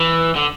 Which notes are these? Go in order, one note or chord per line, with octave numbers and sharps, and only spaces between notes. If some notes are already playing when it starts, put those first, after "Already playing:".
Already playing: E3
D3